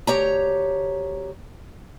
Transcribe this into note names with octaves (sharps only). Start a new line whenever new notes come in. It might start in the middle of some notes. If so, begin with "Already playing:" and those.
D2 G4 C#5 A#5